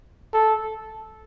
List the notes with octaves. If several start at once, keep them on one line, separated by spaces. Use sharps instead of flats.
A4